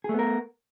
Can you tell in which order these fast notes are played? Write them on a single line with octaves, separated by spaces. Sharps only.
G#4 A3 B3 A#4